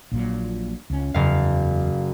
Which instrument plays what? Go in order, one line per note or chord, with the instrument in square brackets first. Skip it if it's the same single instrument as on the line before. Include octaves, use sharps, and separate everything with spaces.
[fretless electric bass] A#1 A#2 F#3
C#2 C#4
[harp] F#1 F5 [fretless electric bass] E2